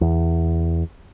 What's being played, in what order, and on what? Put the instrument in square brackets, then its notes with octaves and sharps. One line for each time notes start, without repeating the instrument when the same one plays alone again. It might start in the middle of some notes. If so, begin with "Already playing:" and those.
[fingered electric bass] E2